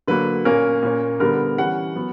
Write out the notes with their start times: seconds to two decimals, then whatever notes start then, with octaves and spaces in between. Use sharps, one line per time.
0.08 D3 F#3 A#3 B4
0.45 A#2 A#3 C#4 A#4
0.83 A#2 A#3 C#4
1.20 D3 G3 B3 A#4
1.58 E3 G3 C#4 F#5
1.96 F#3 B3